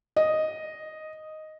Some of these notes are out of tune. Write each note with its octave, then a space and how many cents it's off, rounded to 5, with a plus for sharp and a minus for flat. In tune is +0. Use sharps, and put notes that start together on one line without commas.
D#5 +0